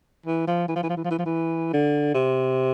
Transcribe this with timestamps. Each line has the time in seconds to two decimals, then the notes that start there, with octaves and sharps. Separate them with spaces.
0.26 E3
0.47 F3
0.68 E3
0.76 F3
0.83 E3
0.89 F3
0.96 E3
1.04 F3
1.11 E3
1.19 F3
1.26 E3
1.73 D3
2.14 C3